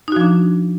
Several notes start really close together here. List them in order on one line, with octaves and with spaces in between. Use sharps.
D#4 F#4 F3 D4